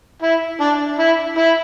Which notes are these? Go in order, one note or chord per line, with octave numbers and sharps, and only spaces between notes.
E4
D4
E4
E4